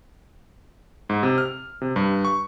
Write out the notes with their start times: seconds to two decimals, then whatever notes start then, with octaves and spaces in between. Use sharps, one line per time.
1.09 G#2
1.23 C3
1.38 F6
1.81 C3
1.96 G2
2.25 C#6